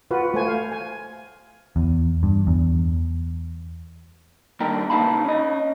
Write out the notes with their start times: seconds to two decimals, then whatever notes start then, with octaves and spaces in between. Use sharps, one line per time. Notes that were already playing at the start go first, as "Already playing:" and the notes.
0.11 F4 F#4 B4
0.34 A3 C5 G#5
0.47 F5
0.72 G#5
1.76 E2
2.23 G2
2.47 E2
4.60 D#3 G3 A#3 D4 G4 A#4
4.90 C#3 D#4 F5 A5 B5
5.25 C#4 D#5